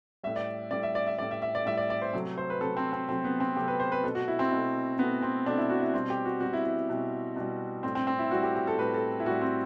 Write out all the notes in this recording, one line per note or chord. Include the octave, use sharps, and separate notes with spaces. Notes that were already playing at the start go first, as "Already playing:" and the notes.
A2 G3 E5
D5
A2 G3 D5
E5
D5
E5
A2 G3 D5
E5
E5
D5
A2 G3 E5
D5
D5
C5
C3 F#3 A3
C5
B4
C3 F#3 A3 A4
C4
C4
C3 F#3 A3 C4
B3
C4
C3 F#3 A3 G4
B4
C5
B4
B2 A3 A4
F#4
E4
C4
B2 A3
B2 A3 B3
C4
B2 A3 D4
E4
F#4
E4
B2 G3 C4
G4
F#4
B2 G3 F#4
E4
E4
B2 G3
B2 G3
A2 G3 C4
C4
C4
E4
A2 G3 F#4
G4
G4
A4
A2 G3 B4
A4
E4
A2 G3 F#4
C4